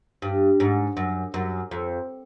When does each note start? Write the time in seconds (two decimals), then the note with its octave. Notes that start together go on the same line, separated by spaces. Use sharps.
0.22 G2
0.60 G#2
0.97 F#2
1.34 F#2
1.71 F2